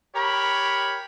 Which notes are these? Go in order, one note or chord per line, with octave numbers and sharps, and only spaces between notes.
G4 A#4 C#5 B5